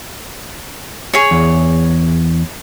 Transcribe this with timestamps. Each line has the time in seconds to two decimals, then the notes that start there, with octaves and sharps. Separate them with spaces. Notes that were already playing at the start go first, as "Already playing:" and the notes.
1.13 G#4 C#5
1.31 E2